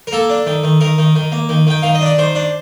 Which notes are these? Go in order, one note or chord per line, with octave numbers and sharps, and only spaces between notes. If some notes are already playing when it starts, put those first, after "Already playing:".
A#4
A#3 A4
D4
D#3
D#3
D#3 A#4
D#3
D#3
A#3
D#3
D#3 G5
D#3 F5
D#5
D4
D5
D#3 C5
D4